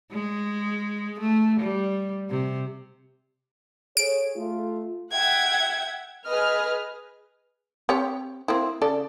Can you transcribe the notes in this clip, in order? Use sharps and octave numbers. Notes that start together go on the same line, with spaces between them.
G#3
A3
G3
C3
G#4 A4 C#5 D7
A3 F4
E5 F#5 G5 G#6
G#4 B4 D#5 F6
C4 G4 C#5
A#3 C4 E4
C#3 A4 D5